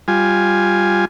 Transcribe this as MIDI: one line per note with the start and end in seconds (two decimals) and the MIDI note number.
0.08 1.05 55
0.08 1.05 65
0.08 1.05 80